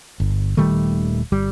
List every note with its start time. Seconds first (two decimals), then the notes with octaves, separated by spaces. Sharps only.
0.20 G1
0.57 D#1 D#3 G3 A3
1.32 G1 G3